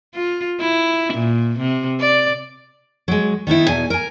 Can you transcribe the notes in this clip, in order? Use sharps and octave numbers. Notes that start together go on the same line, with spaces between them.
F4
E4
A#2
C3
D5
F#3 G#3
D#3 B3 D#4 E4
E2 B2 G#5
A#4 G#5